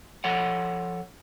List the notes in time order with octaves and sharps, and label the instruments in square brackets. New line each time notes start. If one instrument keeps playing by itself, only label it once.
[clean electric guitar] F3 A4 C#5 F#5